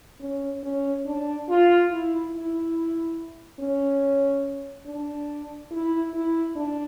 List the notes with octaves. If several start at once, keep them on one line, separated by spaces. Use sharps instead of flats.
C#4
C#4
D4
F4
E4
E4
C#4
D4
E4
E4
D4